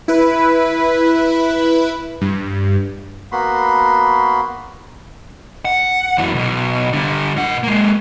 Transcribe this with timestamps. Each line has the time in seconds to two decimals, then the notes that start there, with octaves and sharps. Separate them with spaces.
0.08 E4 B4
2.21 G2
3.32 A#3 B3 F#4 B5 C6
5.65 F#5
6.18 F#2 E3
6.34 B1 B2
6.93 D3 G3
7.37 A#2 F#5
7.63 G#3 A#3